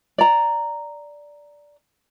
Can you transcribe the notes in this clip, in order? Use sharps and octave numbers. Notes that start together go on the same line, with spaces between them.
D5 A#5